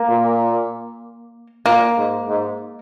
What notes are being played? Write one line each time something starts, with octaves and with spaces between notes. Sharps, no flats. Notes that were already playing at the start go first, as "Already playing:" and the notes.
Already playing: A#3
A#2
A#2 A#3
G#2
G#2